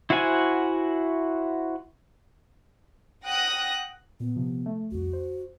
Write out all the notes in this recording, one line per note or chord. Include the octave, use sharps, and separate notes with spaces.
E4 F#4 C5 F#5 G#5
F#5 G5 D#6 F#6 A#6
A#2 B3
C3 F3
A3
C2 F2 F#4
C5